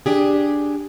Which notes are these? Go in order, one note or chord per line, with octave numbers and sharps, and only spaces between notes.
D4 G4 G#4